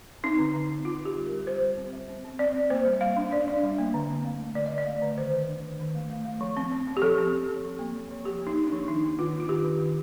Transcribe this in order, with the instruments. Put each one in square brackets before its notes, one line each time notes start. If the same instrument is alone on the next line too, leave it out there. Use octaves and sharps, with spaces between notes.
[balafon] C4 D#4
D3
D3
C4
C4 F4
D3
G4
G3
A#4
G3
G3 C5
G3
C4
G3
C4
C4
C4 D5
C4
A#3 C5
G3
G3 F5
D4
D4 D5
D4
G3
A#3
D3
C4
A3
A3
D3 D5
D3 D#5
D5
A3
D3
D#3 C5
D#3
D4
D#3
D#3
A3
A3
A3
F3
C4
C4
C4
G4
F3 A4
C4
C4
C4
F3
A#3
F3
F3
F3 G4
A#3
D#4
D4
D4
F3
D#3 D#4
A#3
D#3 F4
D4
F4
D#3 G4
D#3
D#3